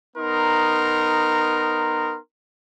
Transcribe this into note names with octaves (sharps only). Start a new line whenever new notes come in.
B3 D#4 A#4 C6